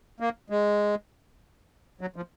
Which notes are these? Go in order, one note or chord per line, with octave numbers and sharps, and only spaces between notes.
A#3
G#3
F#3
F3